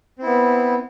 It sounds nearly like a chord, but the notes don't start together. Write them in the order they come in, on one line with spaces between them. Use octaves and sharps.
C4 E4 B3